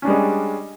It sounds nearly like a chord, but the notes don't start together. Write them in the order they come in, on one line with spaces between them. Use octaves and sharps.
C#4 D4 G3 G#3